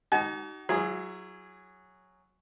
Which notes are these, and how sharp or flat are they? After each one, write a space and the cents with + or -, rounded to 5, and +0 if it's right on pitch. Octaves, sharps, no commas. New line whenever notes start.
D#4 +0 F#4 +45 G#5 +45
F#3 +0 E4 +35 G#4 -5